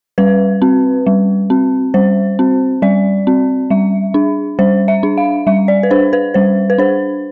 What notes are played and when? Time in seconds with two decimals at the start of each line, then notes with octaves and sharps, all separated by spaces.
0.18 G3 B4
0.62 C4
1.07 G3
1.50 C4
1.94 G3 C5
2.39 C4
2.82 G3 D5
3.27 C4
3.70 G3 E5
4.14 D4
4.59 G3 C5
4.88 E5
5.03 D4
5.18 F5
5.47 G3 E5
5.68 D5
5.83 B4
5.91 D4 C5
6.13 B4
6.34 G3 C5
6.70 B4
6.78 D4 C5